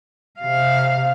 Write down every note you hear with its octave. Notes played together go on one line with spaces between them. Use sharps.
C3 F5